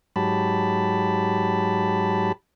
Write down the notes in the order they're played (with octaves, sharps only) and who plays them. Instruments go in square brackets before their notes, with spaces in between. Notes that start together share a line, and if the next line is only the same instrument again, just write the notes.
[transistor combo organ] G#2 F#3 G4 A5 B5